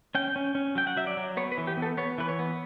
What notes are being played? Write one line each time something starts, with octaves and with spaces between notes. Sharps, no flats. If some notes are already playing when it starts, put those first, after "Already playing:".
C#4 G5
C#4
C#4
F#3 G5
F#5
F#3 E5
D5
F#3
B3 C#5
B4
E3
G4
B3
A4
B3 C#5
E3 B4
C#5
B3